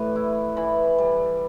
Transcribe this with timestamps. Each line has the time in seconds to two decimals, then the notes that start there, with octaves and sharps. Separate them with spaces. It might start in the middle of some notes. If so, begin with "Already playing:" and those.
Already playing: A2 E3 G3 B4 D5
0.16 E4
0.57 E3 B5
0.98 G3